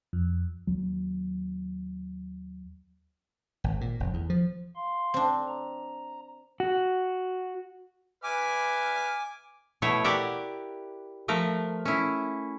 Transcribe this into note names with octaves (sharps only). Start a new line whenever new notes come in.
F2
D#2 F#3
G#1
A#2
F1
E2
F3
F5 C6
C4 D4
A#5
F#4
B4 E5 G#5 D6 F6
B2 A3 E4 C#5
G4 A#4 D5 E5 F#5
F3 A3 A#4
C#4 E4